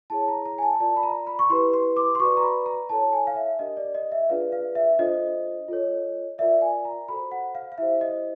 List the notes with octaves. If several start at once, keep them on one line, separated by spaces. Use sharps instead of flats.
E4 G#4 C#5 A5
A#5
A#5
G#5
A5
F4 A#4 D5 A5
B5
A#5
B5
C#6
E4 G4 B4 C6
C6
D6
C6
F#4 B4 D5 C#6
A#5
B5
A#5
E4 A4 C#5 A5
G#5
F5
E5
D4 G4 A#4 D#5
D5
D#5
E5
D4 F4 G#4 B4 D5 F5
F5
E5
D4 F4 A4 C5 D#5
F4 A4 C#5
F4 A#4 D5 E5
G#5
A#5
F#4 A4 C5 B5
F#5
F5
F5
E4 G4 C5 E5
D#5